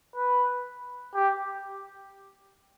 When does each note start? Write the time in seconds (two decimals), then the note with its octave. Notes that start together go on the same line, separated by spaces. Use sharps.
0.16 B4
1.15 G4